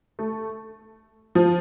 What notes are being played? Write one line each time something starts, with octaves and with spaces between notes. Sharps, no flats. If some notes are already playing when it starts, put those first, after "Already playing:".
A3
F3